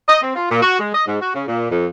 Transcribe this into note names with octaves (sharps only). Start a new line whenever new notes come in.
D#5
C4
F4
A#2
F#4
G#3
D#5
G#2
F#4
C#3
A#2
F2